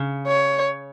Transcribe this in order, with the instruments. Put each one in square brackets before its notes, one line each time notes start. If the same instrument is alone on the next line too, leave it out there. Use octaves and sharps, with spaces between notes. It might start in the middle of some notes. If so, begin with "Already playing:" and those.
Already playing: [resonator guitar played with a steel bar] C#3
[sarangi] C#5